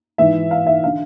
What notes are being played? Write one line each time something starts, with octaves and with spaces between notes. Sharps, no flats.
G#2 E3 E5
F5
E5
D3 F5